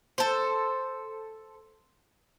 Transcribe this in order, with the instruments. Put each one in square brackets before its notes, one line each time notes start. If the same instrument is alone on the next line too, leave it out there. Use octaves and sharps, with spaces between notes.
[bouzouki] A4 C5